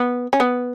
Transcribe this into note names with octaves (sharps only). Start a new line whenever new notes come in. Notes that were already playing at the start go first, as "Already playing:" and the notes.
Already playing: B3
C#4
B3